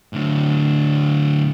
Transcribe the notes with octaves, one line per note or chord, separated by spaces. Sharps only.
A2 D3